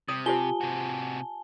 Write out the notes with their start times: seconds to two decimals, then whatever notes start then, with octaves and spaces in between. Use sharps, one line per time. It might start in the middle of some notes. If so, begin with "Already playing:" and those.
0.09 C3 D#6
0.26 F4 G4 C5 G#5 A5 G7
0.61 C3 F#4